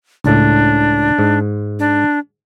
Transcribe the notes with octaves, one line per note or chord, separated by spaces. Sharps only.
C#2 A2 D4
G#2
D4